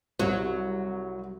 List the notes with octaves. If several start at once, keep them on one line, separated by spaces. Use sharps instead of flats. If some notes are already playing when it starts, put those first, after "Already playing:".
C2 F#3